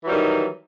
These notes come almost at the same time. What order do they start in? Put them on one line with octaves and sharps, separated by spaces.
E3 F#3 G3 D#3 D#4